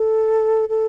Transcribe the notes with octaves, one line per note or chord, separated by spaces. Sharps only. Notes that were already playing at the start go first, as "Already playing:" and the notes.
Already playing: A4
A4